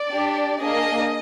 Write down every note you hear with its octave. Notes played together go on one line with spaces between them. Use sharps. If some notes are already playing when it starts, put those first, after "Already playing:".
Already playing: D5
D4 G4
A#3 D4 G#4 D#5